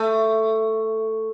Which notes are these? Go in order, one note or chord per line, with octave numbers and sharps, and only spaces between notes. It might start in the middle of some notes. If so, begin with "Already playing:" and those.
Already playing: A3